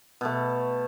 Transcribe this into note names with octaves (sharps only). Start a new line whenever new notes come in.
B2 A3